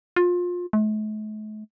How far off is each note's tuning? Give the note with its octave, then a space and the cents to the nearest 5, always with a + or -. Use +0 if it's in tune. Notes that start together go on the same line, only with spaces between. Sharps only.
F4 +25
A3 -45